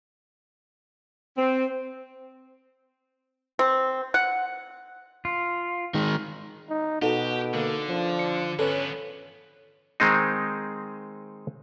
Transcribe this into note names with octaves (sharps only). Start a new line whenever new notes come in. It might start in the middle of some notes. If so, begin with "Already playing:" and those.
C4
C4
F#5
F4
D#3 G#3
D#4
B2 D#4 F#4 G4 A4
D3 A#3
F3 D4
C#7
D3 B3 C#4 A4 B4 C#5
D#3 G#3 C4 D#4